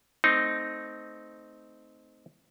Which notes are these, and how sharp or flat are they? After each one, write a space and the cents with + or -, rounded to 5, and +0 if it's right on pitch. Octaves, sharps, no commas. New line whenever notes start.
A3 +0 C4 -10 D#4 +0